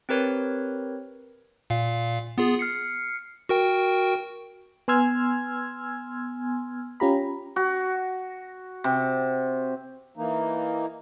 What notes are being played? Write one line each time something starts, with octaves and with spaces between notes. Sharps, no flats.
C4 G4 A#4 B4 C#5
A#2 F5
B3 F4 G#4
F6 C7 C#7
F#4 A#4 G5
B3 G#5 C6 E6 F6 G#6
C#4 F4 G4 A#5 B5
F#4
C3
E3 A#3 D#4